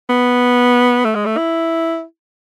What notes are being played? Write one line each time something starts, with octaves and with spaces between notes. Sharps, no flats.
B3
A3
G#3
A3
E4